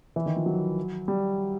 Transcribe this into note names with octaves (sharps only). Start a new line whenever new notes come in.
E3
D#3
F3
F#3
G3